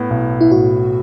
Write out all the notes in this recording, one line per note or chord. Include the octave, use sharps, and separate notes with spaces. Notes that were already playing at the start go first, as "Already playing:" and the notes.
Already playing: A2 B3 E4
B1
E4
A2 F#4